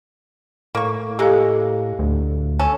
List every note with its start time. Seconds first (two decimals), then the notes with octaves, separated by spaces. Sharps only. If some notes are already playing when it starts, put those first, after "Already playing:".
0.75 A2 A#3 C#6
1.19 G#3 A#3 G4 A4 F5
1.99 D2
2.59 C#4 A4